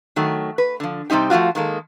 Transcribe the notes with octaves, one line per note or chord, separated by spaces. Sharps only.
D#3 F#3 A3
B4
D3 F3
C3 G3 C4 D#4 G4
F3 A3 C#4 F4 F#4
D#3 G#3 A#3 A4